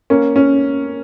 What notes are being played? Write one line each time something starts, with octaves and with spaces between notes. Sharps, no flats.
A#3 C#4
C#4